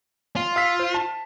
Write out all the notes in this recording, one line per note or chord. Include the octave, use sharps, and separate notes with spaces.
F4
F5 E6 B6
C5
A5